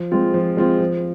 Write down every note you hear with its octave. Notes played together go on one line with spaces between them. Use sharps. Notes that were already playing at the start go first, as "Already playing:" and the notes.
Already playing: F3
G#3 C4 F4
F3
G#3 C4 F4
F3